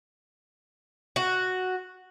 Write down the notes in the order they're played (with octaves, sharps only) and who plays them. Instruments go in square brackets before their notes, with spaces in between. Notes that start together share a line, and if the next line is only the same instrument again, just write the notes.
[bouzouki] F#4